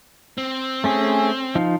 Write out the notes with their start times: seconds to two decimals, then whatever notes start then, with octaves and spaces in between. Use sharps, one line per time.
0.38 C4
0.84 A3 C#4 G#4
1.55 F3 D#4 F5